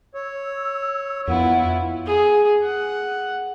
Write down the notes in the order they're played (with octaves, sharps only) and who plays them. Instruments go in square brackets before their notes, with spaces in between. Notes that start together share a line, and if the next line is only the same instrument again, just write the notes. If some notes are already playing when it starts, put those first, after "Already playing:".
[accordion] C#5 [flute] E6
[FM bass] F2 [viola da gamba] B3 E4 F4 [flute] F#5
[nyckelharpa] G#4
F#5